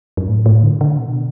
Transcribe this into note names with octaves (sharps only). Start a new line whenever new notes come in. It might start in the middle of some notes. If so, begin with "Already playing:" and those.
F#2
A2
A2
D3
D3
B2